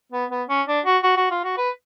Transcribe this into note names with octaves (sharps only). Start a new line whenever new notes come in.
B3
B3
C#4
D4
F#4
F#4
F#4
F4
F#4
B4